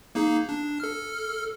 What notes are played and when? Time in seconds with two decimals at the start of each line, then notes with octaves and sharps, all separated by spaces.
0.15 A#3 D#4 G#4
0.49 D4
0.80 A4 F6